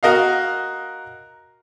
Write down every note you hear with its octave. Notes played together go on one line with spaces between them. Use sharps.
F#4 A#4 D#5 F5